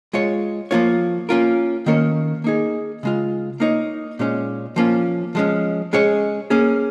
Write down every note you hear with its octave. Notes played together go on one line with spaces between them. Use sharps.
G#3 F4 C#5
F3 A#3 F4 C#5
A#3 C#4 F4 A#4
D#3 A#3 C#4 A#4 C#5
A#3 D#4 G#4
C#3 G#3 F4
A#3 D#4 C#5
A#2 G#3 C#4
F3 A#3 C#4 F4
F3 G#3 C#4
G#3 C#4 G#4 C#5
A#3 C#4 G#4